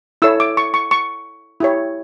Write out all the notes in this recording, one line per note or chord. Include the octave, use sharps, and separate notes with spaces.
E4 A4 C#5 E6
D6
C#6
C#6
C#6
E4 G4 C#5